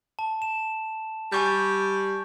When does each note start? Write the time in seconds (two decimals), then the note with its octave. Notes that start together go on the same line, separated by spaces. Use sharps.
0.19 A5
0.42 E7
1.32 G3 G#5 C#6 G6